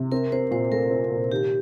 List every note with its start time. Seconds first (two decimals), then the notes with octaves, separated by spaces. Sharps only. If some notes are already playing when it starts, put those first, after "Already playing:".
Already playing: C3
0.12 C4 A#4
0.32 C4 C5
0.51 A#2 C5
0.71 A3 A#4
0.91 C4
1.11 A#2
1.31 D#3 G4